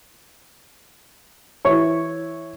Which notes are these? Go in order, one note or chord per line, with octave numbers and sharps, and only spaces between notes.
E3 E4 C#5 C#6